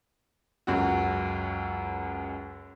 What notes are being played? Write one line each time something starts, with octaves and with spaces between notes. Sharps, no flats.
C#2 F#2 F#4